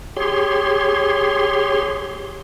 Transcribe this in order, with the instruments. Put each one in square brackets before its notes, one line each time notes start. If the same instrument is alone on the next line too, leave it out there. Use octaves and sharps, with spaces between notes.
[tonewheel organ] G4 G#4 C#5 C6